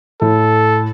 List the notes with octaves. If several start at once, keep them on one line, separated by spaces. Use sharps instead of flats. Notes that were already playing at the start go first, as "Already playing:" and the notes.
A2 A4